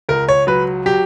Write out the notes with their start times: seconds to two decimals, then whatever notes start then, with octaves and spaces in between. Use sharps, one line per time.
0.09 C#2 A#4
0.29 C#5
0.47 F#3 B4
0.86 F#3 G4